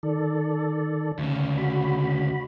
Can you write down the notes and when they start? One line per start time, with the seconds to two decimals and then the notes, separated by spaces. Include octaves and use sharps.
0.03 D#3 A4 D5
1.19 D2 C#3
1.58 F#4 B5